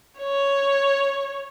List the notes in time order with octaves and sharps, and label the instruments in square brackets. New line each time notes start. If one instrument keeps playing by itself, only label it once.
[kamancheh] C#5